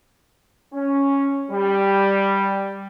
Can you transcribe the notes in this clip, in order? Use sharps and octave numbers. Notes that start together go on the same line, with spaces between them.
C#4
G3